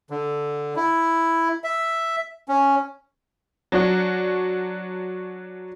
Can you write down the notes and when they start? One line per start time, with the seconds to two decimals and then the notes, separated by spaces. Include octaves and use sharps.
0.10 D3
0.76 E4
1.64 E5
2.48 C#4
3.72 F#3 D4 F#4